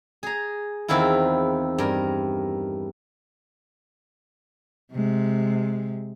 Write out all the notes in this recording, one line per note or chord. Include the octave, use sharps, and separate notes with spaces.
G#4 A#5
E2 D#3 C4 E4 F4
G2 A#4
C3 G#3